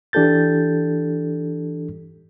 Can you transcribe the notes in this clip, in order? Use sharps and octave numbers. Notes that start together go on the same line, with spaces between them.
E3 D4 G4 A4 G6 A6